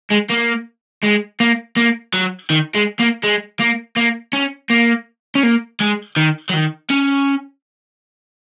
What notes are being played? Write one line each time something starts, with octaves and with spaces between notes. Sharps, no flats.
G#3
A#3
G#3
A#3
A#3
F#3
D#3
G#3
A#3
G#3
A#3
A#3
C#4
A#3
C#4
A#3
G#3
D#3
F#3
D#3
C#4